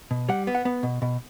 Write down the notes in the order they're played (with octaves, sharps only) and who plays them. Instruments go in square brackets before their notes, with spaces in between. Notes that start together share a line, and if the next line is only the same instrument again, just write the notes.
[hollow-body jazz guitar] B2
G3 F#5
B3
F#5
B3
B2
B2